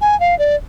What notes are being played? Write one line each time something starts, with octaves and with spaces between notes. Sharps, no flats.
G#5
F5
D5